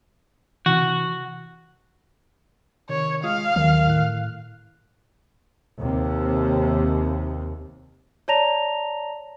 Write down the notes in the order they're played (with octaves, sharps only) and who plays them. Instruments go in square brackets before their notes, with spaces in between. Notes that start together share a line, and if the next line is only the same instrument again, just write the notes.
[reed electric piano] C3 E3 [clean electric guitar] F#4
[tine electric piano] C3 D#3 [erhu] C#5
[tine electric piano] G#3 F4 D#6 [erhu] F5
[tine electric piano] D#2 F#3 [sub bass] D#3
[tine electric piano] A2 F#6
[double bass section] D#2 C3
[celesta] C#5 D5 A5 A#5 A#6 F7